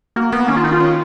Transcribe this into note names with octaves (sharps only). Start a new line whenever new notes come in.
A#3 F#4
A#3 B3
D#3 C#4
F4
D#3 D#4
F4
C#4